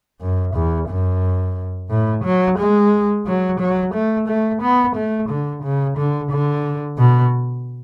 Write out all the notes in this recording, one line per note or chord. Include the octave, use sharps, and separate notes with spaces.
F#2
E2
F#2
A2
F#3
G#3
F#3
F#3
A3
A3
B3
A3
D3
C#3
D3
D3
B2